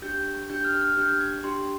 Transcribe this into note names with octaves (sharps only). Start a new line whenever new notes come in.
D4 G4 G6
D4 G4 G6
F6
F6
D4 G4 G6
G#6
D4 G4 C6